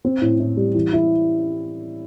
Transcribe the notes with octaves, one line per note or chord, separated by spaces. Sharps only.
C4
A2
A2
G3
E3
E4